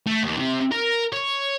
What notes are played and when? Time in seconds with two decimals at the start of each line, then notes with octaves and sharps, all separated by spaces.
0.07 A3
0.23 D#2
0.37 C3
0.72 A#4
1.13 C#5